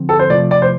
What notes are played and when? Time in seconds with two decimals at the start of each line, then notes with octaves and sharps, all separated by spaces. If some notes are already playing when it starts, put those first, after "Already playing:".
Already playing: D3 F3 C4
0.09 A4
0.19 C5
0.30 C3 F3 A3 D5
0.51 D5
0.62 C5